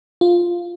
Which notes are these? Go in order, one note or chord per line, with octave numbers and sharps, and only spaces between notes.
F4